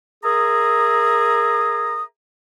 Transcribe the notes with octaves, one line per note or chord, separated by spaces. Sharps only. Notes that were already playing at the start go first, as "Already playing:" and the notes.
G#4 A#4 E5 A#5 D#6